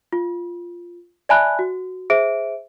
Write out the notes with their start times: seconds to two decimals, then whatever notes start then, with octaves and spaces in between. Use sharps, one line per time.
0.12 F4
1.29 D5 E5 G#5 A5 B5 F#6
1.59 F#4
2.10 G#4 C5 E5 D7